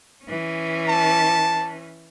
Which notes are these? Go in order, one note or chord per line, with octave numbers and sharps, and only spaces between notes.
E3 C#4
A5